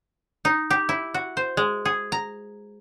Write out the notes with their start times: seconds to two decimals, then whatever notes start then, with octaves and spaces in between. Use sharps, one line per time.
0.45 D#4
0.70 G4
0.89 E4
1.14 F#4
1.37 C5
1.57 G#3
1.85 G#4
2.12 A#5